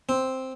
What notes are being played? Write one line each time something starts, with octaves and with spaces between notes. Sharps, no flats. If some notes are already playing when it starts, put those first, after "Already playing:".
C4